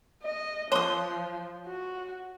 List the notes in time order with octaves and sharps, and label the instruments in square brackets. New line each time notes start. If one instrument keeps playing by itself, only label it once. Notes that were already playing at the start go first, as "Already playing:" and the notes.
[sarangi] D#5
[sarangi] F3 [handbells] C#5 [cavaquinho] C6 D#6
[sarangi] F#4